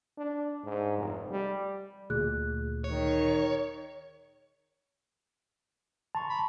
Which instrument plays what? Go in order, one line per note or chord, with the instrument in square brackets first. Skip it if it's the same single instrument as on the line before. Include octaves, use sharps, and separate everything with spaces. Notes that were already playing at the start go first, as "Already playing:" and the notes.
[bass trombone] D4
G#2
F1
G3
[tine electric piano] D2 A#2 [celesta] G#4 F#6
[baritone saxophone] D#3 [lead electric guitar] C#5
[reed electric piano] A5 [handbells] A#5 C6 C#6
[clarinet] B5